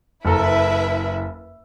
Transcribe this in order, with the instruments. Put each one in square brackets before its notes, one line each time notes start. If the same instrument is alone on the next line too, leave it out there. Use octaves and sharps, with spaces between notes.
[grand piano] F#1 A4 A#5 [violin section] E4 B4 E5